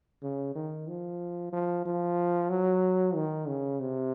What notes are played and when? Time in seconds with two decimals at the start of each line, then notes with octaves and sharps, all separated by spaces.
0.23 C#3
0.55 D#3
0.88 F3
1.53 F3
1.86 F3
2.50 F#3
3.15 D#3
3.48 C#3
3.80 C3